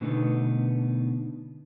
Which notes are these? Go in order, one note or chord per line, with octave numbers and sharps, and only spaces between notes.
B2 D3 A3 B3 D#4